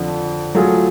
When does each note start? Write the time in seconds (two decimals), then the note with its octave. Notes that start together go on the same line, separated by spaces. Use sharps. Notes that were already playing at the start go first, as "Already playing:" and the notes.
Already playing: F2 D3 F3
0.55 F#3 A3 F4 G#4